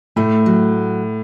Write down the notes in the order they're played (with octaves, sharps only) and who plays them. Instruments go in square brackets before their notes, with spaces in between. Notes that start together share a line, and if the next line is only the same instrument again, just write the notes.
[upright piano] A2 [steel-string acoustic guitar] A3
[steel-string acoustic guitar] F#3